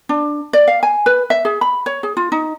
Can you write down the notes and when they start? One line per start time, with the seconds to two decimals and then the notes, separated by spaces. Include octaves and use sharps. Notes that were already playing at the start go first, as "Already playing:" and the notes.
0.09 D4
0.53 D5
0.68 F5
0.83 G#5
1.06 B4
1.30 E5
1.45 G#4
1.61 B5
1.86 C#5
2.03 G#4
2.17 F4
2.32 D#4